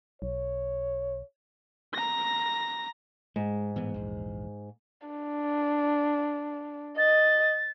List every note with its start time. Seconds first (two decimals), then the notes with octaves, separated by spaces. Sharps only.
0.22 B1 C#5
1.94 A#5 A#6
3.36 G#2 G#3
3.76 A2 E3 B3
3.94 A#1 E2
5.07 D4
6.98 D#5 A6